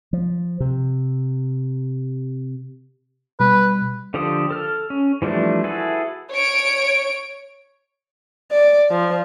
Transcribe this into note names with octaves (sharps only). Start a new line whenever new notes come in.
F3
C3
B2 G3 B4
D3 F3 G4 A4 D#6
A4 F6
C#4
E3 F3 G3 A3 D4
E4 F#4 G#4 A4 B4
C#5 D7
D5
F3